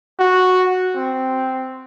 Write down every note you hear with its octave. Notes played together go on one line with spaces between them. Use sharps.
F#4
C4